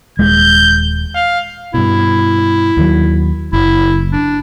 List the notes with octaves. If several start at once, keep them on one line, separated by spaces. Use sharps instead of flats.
D#1 G#3 G6
F5
G2 B2 E4
D#2 D#3 F#3
F#1 E4
D4